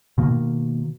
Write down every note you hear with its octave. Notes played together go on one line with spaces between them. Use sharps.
B2 D#3 A#3